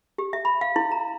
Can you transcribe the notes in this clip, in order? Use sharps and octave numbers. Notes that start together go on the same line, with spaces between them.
G4
E5
B5
F5
E4
A#5